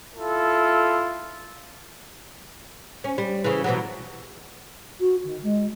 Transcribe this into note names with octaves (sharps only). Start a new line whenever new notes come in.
E4 F4 A4
C#4
G3
C#3 E3
B2 E3 F#3
F#4
D#3
G#3